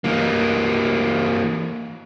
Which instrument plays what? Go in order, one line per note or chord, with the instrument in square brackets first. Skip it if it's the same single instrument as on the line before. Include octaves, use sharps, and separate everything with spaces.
[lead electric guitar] E3 A#3